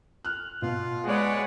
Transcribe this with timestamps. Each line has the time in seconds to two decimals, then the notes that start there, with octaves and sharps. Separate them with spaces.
0.25 F6 F#6
0.62 B2 F4
1.08 G#3 B4 C#5 D5 F#5